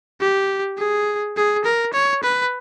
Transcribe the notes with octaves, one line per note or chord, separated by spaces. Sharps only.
G4
G#4
G#4
A#4
C#5
B4